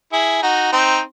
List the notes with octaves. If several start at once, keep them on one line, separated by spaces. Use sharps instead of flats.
E4 G#4
D#4 F#4
C4 D#4